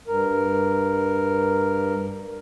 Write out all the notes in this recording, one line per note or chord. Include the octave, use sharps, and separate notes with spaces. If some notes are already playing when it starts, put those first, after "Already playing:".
G2 A#4